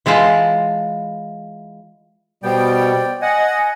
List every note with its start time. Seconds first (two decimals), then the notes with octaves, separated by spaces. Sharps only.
0.06 E3 G#3 E4 F4 A5
2.44 B2 G3 B3 C5 D5 G5
3.22 D#5 F#5 G#5